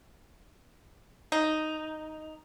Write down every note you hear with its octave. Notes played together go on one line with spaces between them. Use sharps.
D#4